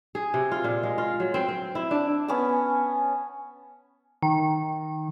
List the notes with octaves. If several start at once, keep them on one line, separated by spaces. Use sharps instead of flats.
G#4
C3
F4
A#2
G#3
F4
F#3
C4
C4
E4
D4
B3 C#4 G#5 A5
D#3